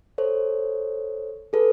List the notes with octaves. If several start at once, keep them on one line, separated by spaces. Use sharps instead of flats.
A4 C5 C#5
G#4 A4 B4